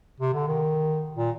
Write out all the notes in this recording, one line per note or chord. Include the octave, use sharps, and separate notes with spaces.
C3
D3
D#3
A#2